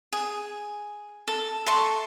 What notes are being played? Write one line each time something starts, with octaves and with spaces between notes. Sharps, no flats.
G#4
A4
A4 E5 C6 C#6